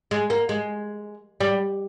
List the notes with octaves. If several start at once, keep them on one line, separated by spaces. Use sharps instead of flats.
G#3
A#3
G#3
G3